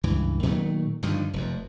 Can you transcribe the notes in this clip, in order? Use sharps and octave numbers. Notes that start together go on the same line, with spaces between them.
C#2 G2 E3
A#2 D#3 F#3 A3
G2 D3 D#3 F3
F1 F2